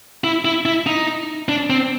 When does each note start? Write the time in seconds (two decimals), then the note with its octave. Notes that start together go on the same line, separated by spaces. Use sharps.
0.24 E4
0.45 E4
0.65 E4
0.87 D#4
1.49 D4
1.70 C4